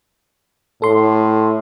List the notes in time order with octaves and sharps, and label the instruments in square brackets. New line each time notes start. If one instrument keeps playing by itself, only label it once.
[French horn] A2 [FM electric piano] A4 C6